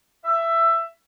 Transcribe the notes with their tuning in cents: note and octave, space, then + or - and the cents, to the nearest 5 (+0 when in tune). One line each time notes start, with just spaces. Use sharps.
E5 +15